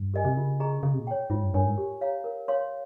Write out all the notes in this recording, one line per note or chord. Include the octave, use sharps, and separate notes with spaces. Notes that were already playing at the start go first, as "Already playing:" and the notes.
Already playing: G2
G4 A#4 D#5 G#5
C3
C#3 F4
G#4 D#5 A#5 C#6
C#3 G#4
C3
A#2
C#5 G5
G#2 F4
G2
G2 A#4 C#5 G#5
G#2
G4
C#5 F5 A#5
A#4
C#5 F5 C6